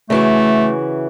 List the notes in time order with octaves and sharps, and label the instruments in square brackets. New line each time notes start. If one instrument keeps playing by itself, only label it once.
[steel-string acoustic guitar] C#3 E3 F#4 [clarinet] A3